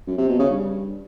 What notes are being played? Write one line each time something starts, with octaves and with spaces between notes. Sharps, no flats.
F#2
C3
B2
C#3
G2